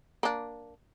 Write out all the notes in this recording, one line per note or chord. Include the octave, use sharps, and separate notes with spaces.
A#3 D4